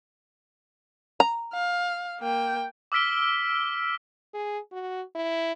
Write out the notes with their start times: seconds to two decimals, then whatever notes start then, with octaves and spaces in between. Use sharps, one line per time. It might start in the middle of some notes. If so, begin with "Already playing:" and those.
1.20 A#5
1.53 F5
2.20 A#3 G5
2.92 D6 E6 F6 B6 D7 G7
4.34 G#4
4.72 F#4
5.15 E4